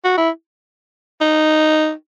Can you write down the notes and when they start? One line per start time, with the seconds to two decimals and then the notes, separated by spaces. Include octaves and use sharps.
0.04 F#4
0.17 E4
1.21 D#4